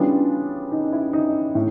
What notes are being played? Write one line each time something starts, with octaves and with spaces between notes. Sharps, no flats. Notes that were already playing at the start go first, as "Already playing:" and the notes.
Already playing: C#3 E3 G3 B3 D4 F4
D#4
E4
D#4
A2